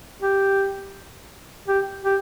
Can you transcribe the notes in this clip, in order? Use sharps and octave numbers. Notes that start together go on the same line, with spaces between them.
G4
G4
G4